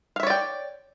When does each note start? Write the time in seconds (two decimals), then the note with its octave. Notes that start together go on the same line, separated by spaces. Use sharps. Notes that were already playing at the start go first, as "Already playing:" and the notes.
0.16 F5
0.20 E5
0.23 C#5
0.27 D5
0.30 G5